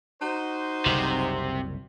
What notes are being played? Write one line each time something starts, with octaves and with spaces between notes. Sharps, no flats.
D#4 F#4 C5
F#1 C2 C3